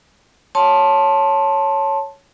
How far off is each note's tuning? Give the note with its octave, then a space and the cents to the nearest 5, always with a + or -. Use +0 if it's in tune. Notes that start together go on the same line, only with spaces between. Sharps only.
C#5 +0 A5 +0 C6 +25